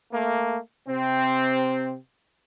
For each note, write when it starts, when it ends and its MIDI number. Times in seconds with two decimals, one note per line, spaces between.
0.12 0.58 57
0.12 0.58 58
0.88 1.96 48
0.88 1.96 60